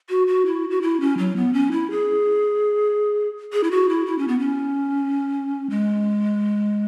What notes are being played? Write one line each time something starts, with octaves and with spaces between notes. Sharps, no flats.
F#4
F#4
E4
F#4
E4
C#4
F#3
B3
C#4
E4
G#4
G#4
E4
F#4
E4
E4
C#4
B3
C#4
G#3